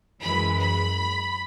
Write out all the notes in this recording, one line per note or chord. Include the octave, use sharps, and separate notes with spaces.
F#2 E3 G#3 B5
B5